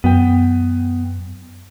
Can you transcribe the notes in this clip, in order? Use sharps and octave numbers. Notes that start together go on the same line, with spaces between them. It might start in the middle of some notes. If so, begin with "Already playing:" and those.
F#2 B3 G5